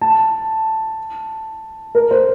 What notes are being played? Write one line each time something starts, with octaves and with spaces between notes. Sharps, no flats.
A5
A#4
C5